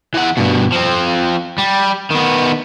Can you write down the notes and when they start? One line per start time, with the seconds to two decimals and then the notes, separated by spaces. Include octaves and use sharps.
0.14 E3 F#5
0.37 G2 B2
0.72 F3 C4
1.58 G3
2.11 D#3 B3